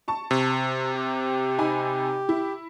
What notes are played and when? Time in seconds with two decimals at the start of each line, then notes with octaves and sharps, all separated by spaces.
0.08 A5 C#6
0.31 C3
0.94 G4
1.59 D#4 G#5 B5
2.29 E4